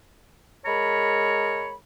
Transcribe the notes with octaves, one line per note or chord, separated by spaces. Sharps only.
G#3 A#4 C#5 A#5 B5